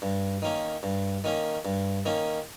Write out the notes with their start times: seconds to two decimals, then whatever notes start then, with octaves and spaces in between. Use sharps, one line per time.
0.02 G2
0.42 D#3 A#3 C#4
0.83 G2
1.24 D#3 A#3 C#4
1.65 G2
2.05 D#3 A#3 C#4